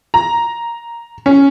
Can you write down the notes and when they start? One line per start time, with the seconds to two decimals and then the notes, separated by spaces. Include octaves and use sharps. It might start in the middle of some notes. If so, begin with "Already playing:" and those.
0.14 A#5
1.26 C#4